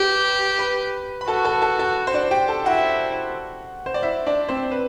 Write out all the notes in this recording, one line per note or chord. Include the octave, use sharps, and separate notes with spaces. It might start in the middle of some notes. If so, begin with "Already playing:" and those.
Already playing: G4 B4 B5
B4 B5
B5
F#4 A4 A5
A4 A5
A4 A5
A4 A5
C5
D4 D5
G4 G5
A4 A5
E4 F#4 F#5
C5
D5
E4 E5
D4 D5
C4 C5
B4